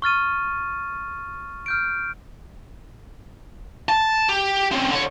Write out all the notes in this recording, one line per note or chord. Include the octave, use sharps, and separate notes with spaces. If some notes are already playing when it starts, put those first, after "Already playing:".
C#6 F6 A6 D#7
F6 G6 D7
A5
G4
C4 C#4
D3 C#5